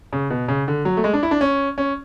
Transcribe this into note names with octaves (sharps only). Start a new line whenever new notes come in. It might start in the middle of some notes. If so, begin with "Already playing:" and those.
C#3
B2
C#3
D3
F#3
A3
G#3
D4
E4
D4
C#4
C#4